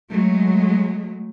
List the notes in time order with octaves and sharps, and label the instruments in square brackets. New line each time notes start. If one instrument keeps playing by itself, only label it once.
[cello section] F#3 G#3 A3